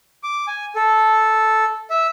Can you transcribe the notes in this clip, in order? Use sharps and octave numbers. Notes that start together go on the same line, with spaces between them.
D6
G#5
A4
E5